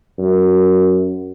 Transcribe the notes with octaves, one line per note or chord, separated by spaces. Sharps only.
F#2